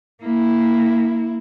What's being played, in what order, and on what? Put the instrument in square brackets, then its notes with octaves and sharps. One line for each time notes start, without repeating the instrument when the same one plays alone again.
[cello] A#3 E4